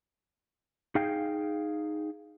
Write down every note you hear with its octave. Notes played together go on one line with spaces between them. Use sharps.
D#4 G#4 F5 G5